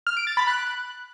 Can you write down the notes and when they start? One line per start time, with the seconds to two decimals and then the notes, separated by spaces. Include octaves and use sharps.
0.07 F6
0.17 D7
0.27 A6
0.37 B5
0.47 F#6